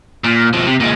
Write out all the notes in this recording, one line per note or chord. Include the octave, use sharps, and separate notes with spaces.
A#2
B2 F3
C3
A#2 G#3